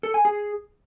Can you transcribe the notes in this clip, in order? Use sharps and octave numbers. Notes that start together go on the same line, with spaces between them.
A4
G#5
G#4